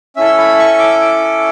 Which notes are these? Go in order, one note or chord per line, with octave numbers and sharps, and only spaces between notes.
C#4 E4 A4 E5
B5
C#6
D6
D6